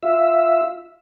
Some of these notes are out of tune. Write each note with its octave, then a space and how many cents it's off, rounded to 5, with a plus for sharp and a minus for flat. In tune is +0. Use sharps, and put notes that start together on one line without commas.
F4 +0 E5 +0